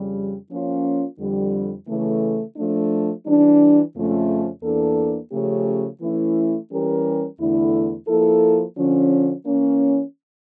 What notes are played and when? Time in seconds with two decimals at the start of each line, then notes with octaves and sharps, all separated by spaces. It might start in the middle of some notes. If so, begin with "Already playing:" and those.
Already playing: F2 C#3 G3
0.49 F3 A#3 C#4 F4
1.19 F2 D3 G3
1.87 C#3 E3 A3
2.56 F3 A3 D4
3.26 E3 G3 D4
3.94 F2 C#3 F3 A3 C#4
4.63 E2 E3 A#3 D4 A4
5.31 C#3 F3 A3 C#4 G4
6.01 E3 A3 C#4 E4
6.70 E3 G3 C#4 G4 A#4
7.39 E2 D3 A3 E4
8.07 F3 A#3 E4 A4
8.77 D3 F3 C#4
9.45 E3 A#3 C#4